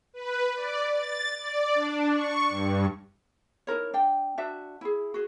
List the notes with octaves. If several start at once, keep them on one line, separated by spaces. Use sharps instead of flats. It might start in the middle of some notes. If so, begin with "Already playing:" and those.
B4
D5
A6
D5
D4
C#6
G2
D#4 E4 A#4 C#5
D4 G5
D4 F#4 E5
E4 G#4
F#4 G#4